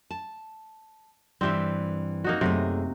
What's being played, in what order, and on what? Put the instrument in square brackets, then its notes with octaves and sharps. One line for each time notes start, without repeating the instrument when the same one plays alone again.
[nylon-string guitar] A5
[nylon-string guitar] G2 E3 [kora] C4 G4 E5
[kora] A#3 D#4 F#4
[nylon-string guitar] F#2 A3 G#4 [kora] C3